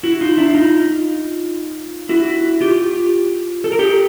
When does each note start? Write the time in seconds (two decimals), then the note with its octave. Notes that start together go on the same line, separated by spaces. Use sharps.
0.03 E4 F#4
0.21 D#4 F4
0.37 D4 E4
0.55 D#4 F4
2.09 E4 F#4
2.61 F4 G4
3.64 A4
3.72 A#4
3.79 G4 A4